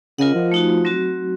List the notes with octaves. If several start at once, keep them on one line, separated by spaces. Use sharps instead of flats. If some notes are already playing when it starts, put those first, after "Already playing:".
C#3 F4 A#4 D#5 F#5
F3
A3 D#4 F#4
F#3 C4 F#4